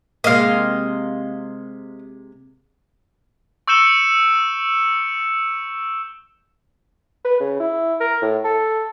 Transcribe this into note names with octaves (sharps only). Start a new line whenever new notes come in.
C3 G#3 A#3 D#5 F5
C#6 E6 G6 C#7 E7 G7
B4
C#3
E4
A#4
A2
A4